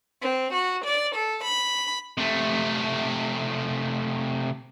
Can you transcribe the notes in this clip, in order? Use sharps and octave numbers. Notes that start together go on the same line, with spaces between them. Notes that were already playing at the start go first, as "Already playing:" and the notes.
C4
F#4
D5
A4
B5
C3 A3